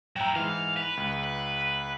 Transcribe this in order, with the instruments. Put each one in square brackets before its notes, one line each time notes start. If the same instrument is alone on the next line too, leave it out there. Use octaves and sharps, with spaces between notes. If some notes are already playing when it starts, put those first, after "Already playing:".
[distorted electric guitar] F#3 E4 [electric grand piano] G5 A#5
[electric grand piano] G#2 E3 [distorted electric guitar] F5
[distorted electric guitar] B4
[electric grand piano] C#2